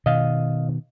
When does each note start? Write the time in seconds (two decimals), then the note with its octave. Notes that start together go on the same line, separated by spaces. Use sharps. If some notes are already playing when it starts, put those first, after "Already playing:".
0.06 B2 D#3 D#5 F5